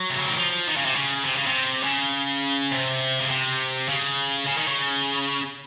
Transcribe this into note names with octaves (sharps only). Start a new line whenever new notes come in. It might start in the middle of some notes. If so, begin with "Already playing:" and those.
Already playing: F#3
C3
C#3
D#3
F3
D#3
C#3
C3
C#3
C3
C#3
C3
C#3
C3
C#3
C3
C#3
C#3
D#3
C#3